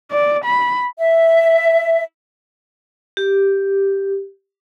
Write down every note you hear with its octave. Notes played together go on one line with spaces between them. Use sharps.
D5
B5
E5
G4